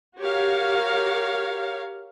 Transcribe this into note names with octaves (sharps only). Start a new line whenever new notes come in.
F#4 G4 A#4 C#5 F5